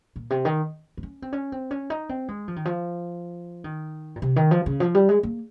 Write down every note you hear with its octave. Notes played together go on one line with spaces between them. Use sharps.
A#2
C3
D#3
C4
C#4
C4
C#4
C4
C#4
D#4
C4
G#3
F3
D#3
F3
D#3
A#2
C3
D#3
F3
C#3
F3
G3
G#3
A#3